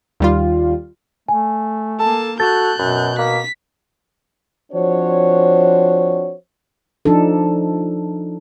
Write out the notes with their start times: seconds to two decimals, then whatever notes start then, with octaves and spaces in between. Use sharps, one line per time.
0.20 D#2 G3 F4
1.28 A3 G#5
2.00 A#3 A4 A5
2.40 F#4 A4 F#6 G6 A6
2.79 F#2 B2
3.19 A#3 B6
4.73 F3 C4 D4 F#4 C5 C#5
7.05 F3 D4 D#4 A4